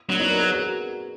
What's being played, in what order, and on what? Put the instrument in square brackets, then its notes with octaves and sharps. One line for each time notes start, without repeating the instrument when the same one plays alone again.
[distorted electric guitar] F#3 [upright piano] A#3 D4
[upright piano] B3 D#4
A#4 D5
G#4 B4
F#4 A#4